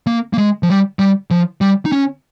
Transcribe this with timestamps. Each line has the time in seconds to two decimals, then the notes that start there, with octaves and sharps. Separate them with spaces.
0.07 A#3
0.33 A#3
0.38 G#3
0.63 F3
0.69 G3
0.99 G3
1.31 F3
1.61 G3
1.85 D#4
1.92 C#4